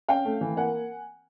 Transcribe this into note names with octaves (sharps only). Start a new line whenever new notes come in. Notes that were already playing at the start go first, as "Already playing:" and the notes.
C#4 F5 G5
A3
E3
A#3 F#5 G#5